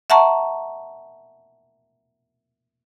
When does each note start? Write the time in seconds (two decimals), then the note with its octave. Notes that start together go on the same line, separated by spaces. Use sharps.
0.10 E5 F#5 A5 A#5 C#6